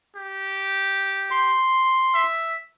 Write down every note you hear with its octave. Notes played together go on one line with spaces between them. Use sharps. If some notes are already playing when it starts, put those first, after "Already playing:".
G4
C6
E5